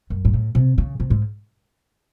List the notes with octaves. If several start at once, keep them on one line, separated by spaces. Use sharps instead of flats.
F#2
G#2
A2
C3
C#3
C3
G#2